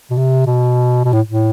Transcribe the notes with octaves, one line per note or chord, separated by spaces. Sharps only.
B2
C3
B2
B2
A2
A2